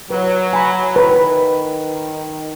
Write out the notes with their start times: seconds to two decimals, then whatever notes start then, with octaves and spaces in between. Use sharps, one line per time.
0.10 F#3 B4
0.53 G#5 B5
0.96 D#3 B4